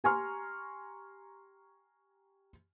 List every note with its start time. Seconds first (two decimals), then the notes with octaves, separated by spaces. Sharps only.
0.04 G4 G#5 A#5 C6 C#6 F6